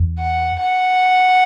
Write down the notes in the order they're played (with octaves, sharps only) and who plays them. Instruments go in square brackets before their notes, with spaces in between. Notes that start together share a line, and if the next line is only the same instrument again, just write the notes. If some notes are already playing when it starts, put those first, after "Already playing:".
Already playing: [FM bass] E2
[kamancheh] F#5
F#5